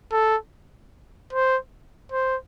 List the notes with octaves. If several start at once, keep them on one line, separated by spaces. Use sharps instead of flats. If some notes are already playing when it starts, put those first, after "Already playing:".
A4
C5
C5